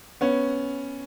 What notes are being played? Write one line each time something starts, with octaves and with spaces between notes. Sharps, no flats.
B3 C#4